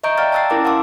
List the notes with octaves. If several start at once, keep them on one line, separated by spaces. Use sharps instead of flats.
D#5 E5 A#5 C#6 G6 D7
D5 F5 G5 F6 A6 D7
A5 A#5 E6 F#6 A6 C7
C#4 E4 A#4 D6
F5 F#5 A5 C6 D6 E6